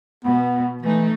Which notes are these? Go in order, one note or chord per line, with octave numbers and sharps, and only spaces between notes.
B2 B3
E3 A3 D#4